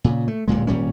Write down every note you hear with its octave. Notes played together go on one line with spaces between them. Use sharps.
A#2 C#3
A3
D1 G2 A#2 G#3
G#1 A#2 G3 C#4